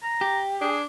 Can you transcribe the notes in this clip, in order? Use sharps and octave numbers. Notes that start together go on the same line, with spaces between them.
A#5
G4
D4 G#4